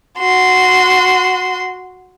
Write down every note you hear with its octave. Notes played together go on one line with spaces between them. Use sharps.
F#4 C6